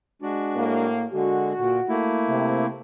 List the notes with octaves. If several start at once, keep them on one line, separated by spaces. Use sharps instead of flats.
G#3 D4 F#4
A2 A#3
D3 G#3 F#4
A#2
A3 A#3 E4
C3